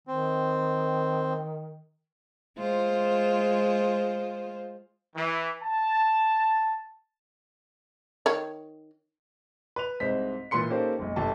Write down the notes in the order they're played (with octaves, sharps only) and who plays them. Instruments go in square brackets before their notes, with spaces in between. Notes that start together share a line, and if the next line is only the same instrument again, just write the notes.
[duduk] D#3 [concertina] C4
[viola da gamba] G#3 F4 C5
[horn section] E3
A5
[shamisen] D#3 C#5
[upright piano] B4 F7
C2 G#2 C5 B6
A#2 E3 B4 C6 C#7
A#3 C#4 D#4 G4 A4 C5
F#1 B1
G1 G4 A4 G5 A5